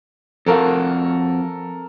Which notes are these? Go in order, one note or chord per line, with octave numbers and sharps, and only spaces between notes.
F2 F#4 A4 A#4 F5